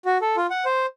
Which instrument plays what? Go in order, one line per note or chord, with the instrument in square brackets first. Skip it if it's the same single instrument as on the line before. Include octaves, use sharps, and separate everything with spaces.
[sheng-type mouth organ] F#4
A4
F4
F#5
C5